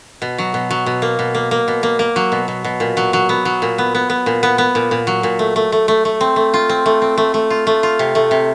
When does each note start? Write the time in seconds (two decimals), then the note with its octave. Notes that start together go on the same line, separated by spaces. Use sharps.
0.22 B2
0.38 F#3
0.54 B2
0.71 F#3
0.86 B2
1.02 A#3
1.19 B2
1.34 A#3
1.51 A#3
1.68 B2
1.83 A#3
1.99 A#3
2.16 F#3
2.32 B2
2.48 B2
2.64 B2
2.80 A#2
2.97 F#3
3.13 F#3
3.29 B3
3.45 F#3
3.62 A#2
3.78 B3
3.95 B3
4.10 B3
4.26 A#2
4.43 B3
4.58 B3
4.75 A#2
4.91 A#2
5.07 F#3
5.23 A#2
5.39 A3
5.56 A3
5.72 A3
5.88 A3
6.05 A3
6.21 C4
6.36 A3
6.54 F4
6.69 C4
6.86 A3
7.02 C4
7.18 A3
7.34 A3
7.50 F4
7.67 A3
7.83 F4
7.99 C3
8.15 A3
8.31 C3